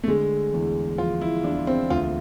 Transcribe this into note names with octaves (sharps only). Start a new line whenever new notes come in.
A3
D3 G#3
E2
F3 F4
E4
E2 D4
C4
D2 F4